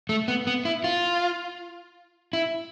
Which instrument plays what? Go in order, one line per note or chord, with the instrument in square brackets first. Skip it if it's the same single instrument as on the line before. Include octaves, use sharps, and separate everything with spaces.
[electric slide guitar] A3
B3
B3
E4
F4
E4